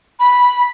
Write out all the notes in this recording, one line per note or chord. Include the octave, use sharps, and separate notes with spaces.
B5